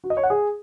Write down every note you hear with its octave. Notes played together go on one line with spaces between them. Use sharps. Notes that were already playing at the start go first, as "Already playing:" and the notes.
F#4
D#5
C#5
F#5
G#4